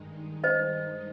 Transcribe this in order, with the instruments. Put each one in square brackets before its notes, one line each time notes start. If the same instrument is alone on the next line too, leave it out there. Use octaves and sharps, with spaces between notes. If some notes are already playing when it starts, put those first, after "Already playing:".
Already playing: [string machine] G2 D#3 G#3 D#4
[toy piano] C5 D#5